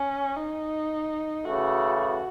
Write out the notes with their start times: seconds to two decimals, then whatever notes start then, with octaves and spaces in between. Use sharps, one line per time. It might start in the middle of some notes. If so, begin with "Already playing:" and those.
Already playing: C#4
0.36 D#4
1.45 C#3 E3 A3 F#4
2.00 F#4